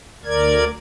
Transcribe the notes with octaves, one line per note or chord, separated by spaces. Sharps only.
D2 A#4 D5 G#6